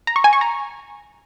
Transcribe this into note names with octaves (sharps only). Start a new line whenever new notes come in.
A#5
C#6
G#5
C#6
A#5